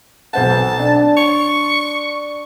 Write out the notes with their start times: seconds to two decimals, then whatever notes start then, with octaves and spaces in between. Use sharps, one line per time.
0.33 B1 C5 F#5 A5
0.80 D4
1.17 C#6